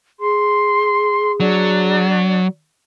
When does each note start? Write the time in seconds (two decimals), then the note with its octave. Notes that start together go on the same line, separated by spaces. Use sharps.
0.20 G#4 C6
1.40 F#3 D4